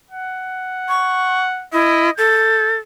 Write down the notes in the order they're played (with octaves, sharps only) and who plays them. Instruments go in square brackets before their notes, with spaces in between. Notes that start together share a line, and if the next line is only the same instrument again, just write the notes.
[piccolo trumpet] F#5
[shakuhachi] C#6
[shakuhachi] E4 [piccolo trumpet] D#5
[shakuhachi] A4 [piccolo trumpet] G6